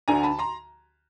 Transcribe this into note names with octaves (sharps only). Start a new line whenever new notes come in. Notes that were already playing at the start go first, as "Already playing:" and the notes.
D2 D3 G#5 A#5
A5 B5
A#5 C6